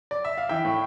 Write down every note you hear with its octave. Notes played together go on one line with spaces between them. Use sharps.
D5
E5
F5
E3 E5 G5
A2